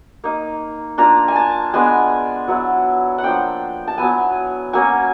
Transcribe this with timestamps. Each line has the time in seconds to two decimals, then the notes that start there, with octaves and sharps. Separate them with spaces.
0.24 A#3 D#4
0.98 A#3 D4 F4 A#5
1.28 G#5
1.36 A5
1.74 G#3 B3 D4 G#5
2.48 F#3 B3 E4
3.18 F#5
3.24 F3 A#3 D4 G5
3.88 A5
3.98 F#3 B3 E4 G#5
4.73 F#3 A#3 C#4 G#5